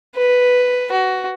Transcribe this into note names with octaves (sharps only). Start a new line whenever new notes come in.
B4
F#4